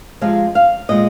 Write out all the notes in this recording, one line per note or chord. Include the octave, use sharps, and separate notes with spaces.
C3 F3 G#3 F5
F5
A#2 G#3 D#5